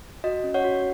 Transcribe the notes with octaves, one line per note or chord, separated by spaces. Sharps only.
F#4 D#5
C#4
C#5 F#5
F#4